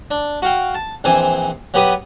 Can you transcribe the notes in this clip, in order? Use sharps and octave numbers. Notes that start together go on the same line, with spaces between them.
D4
F#4 F5 G5
A5
A#1 E3 C4 C5 G#5
F#3 B3 G4 B4 D#6